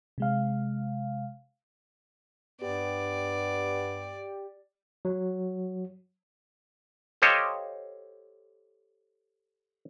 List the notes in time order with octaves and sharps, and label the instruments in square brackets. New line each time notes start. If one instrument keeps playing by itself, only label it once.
[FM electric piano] C3 G#3 F5
[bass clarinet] G2 [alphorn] B3 [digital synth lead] G4 [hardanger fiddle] D5
[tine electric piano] F#3
[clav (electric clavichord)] G4 A4 C5 C#5 D#5 F5